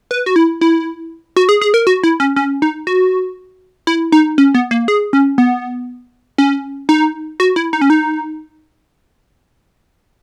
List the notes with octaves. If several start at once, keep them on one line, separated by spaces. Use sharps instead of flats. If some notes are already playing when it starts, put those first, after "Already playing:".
B4
F#4
E4
E4
F#4
G#4
G#4
A#4
F#4
E4
C#4
C#4
D#4
F#4
E4
D#4
C#4
B3
A#3
G#4
C#4
B3
C#4
D#4
F#4
E4
D#4
C#4
D#4